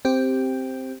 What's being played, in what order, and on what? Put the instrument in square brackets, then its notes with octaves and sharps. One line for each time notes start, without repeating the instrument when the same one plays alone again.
[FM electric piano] C4 G4